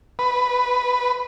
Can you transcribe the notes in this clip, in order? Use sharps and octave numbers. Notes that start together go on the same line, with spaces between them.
B4